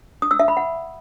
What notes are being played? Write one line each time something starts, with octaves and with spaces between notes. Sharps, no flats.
D#6
E6
E5
B5
F#5